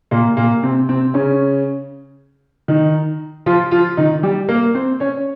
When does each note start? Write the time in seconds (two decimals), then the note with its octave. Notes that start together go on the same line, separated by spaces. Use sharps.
0.11 A#2 A#3
0.37 A#2 A#3
0.63 C3 C4
0.89 C3 C4
1.14 C#3 C#4
2.68 D#3 D#4
3.46 F3 F4
3.71 F3 F4
3.97 D#3 D#4
4.23 G3 G4
4.49 A#3 A#4
4.75 C4 C5
5.00 C#4 C#5